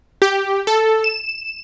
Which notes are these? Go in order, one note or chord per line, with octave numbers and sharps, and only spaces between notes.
G4
A4
E7